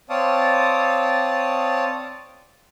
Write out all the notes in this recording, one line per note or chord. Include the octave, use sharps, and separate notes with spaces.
C4 C#5 D5 F5 A5 D#6